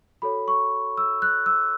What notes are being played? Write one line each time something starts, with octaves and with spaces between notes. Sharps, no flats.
F#4 A4 C#5 B5
C#6
E6
F#6
E6